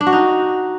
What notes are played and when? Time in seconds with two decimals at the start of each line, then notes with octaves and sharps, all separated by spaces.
0.01 D4
0.07 F#4
0.13 D#4